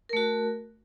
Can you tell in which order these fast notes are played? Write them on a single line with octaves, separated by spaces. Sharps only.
A#4 A3 F#4